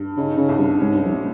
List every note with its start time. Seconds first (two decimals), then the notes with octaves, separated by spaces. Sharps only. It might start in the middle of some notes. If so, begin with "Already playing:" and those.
Already playing: G2
0.17 C#3 D#4
0.37 C#3
0.49 C2
0.59 G2
0.79 G#2 C#4
0.95 G2
1.05 F2
1.11 A#2